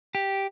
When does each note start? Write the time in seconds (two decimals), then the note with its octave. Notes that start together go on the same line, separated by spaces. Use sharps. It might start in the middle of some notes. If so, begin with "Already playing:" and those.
0.15 G4